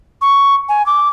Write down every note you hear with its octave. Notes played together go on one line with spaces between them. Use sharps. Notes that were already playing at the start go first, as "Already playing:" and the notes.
C#6
G#5
D6